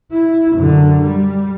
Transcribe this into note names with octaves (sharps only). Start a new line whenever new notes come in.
E4
F#2 D3
G3